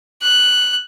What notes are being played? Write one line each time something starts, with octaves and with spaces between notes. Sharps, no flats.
F#6